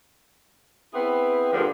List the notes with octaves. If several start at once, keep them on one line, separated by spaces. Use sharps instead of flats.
B3 C4 E4 G#4 B4
D2 G2 D3 F3 G#4 A#4